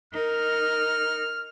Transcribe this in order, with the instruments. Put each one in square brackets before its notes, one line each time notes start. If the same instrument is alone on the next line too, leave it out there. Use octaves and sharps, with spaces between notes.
[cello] D#4 A#4 [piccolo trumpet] F6